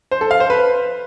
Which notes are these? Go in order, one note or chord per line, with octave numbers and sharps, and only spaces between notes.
C5
A4
F5
C5
B4